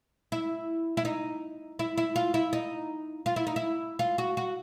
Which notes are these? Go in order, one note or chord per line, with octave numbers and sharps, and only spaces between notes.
E4
E4
D#4
E4
E4
F4
E4
D#4
F4
E4
D#4
E4
F4
F#4
F#4